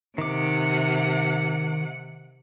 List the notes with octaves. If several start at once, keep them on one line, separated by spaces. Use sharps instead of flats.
C3 D#3 F#5 D6